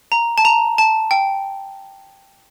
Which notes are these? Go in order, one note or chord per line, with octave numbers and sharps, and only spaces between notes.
A#5
A5
A#5
A5
G5